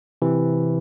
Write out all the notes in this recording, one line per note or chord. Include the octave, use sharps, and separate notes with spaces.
C3 E3